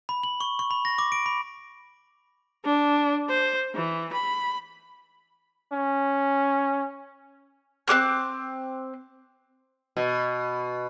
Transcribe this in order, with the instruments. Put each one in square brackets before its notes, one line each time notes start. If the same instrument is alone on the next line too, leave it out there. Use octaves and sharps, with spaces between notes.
[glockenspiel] B5
F#7
C#6
C#6
B5
A#6
D6
D7
B5
[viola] D4
C5
E3
B5
[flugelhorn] C#4
[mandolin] C4 A#4 D6 F#6
[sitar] B2